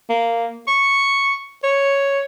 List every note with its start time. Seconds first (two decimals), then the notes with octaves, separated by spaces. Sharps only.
0.09 A#3
0.68 C#6
1.64 C#5